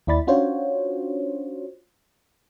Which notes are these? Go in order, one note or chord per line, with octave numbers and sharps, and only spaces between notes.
D#2 E4 D5 B5 A6
C#4 D4 F4 F#4 C5 C#5